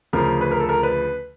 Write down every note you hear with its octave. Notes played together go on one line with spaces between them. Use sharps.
D2 C#3 F3 A#4
B4
A#4
A4
A#4
B4